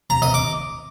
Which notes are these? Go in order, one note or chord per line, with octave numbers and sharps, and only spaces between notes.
A#5
D#5
D6